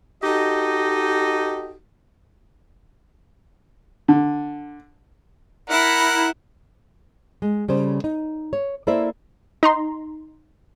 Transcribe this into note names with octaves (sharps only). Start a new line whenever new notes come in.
D#4 F#4 G4 A4 D#5
D3
E4 A#4 F#5
G#3
C#3 G3 C#4 A4 C5
D#4
C#5
A#3 E4 A4 C5 D5 E5
D#4 A#5 C6